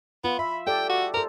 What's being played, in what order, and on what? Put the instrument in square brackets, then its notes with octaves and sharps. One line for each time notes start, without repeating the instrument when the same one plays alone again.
[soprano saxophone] B3 [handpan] F4
[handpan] E5 [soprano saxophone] B5
[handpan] G4 A4 D5 [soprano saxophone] G5
[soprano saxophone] F#4
[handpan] A4 C5 [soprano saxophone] A#4